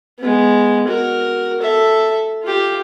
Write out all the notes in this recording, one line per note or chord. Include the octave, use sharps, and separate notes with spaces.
G#3 B3
F#4 A#4
A4 E5
F4 G4